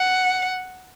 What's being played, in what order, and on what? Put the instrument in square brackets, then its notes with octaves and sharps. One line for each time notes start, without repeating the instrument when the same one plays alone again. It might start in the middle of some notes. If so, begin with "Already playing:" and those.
Already playing: [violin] F#5